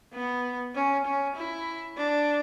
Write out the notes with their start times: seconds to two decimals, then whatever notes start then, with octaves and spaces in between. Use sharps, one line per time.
0.13 B3
0.75 C#4
1.06 C#4
1.36 E4
1.97 D4